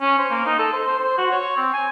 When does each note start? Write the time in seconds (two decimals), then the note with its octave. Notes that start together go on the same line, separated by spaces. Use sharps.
0.01 C#4
0.19 C5
0.31 A#3
0.46 D#4
0.59 A4
0.73 C5
0.87 C5
0.99 C5
1.18 F#4
1.32 C#5
1.57 C4
1.73 G#5